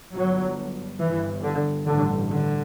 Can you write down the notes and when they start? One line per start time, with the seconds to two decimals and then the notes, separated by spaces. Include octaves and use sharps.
0.13 G1 G2 F#3
1.00 G1 G2 E3
1.43 D3
1.86 A1 G2 D3
2.29 D3